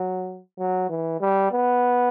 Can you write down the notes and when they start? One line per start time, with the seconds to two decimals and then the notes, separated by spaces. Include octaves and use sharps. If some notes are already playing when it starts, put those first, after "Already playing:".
Already playing: F#3
0.59 F#3
0.89 E3
1.20 G3
1.52 B3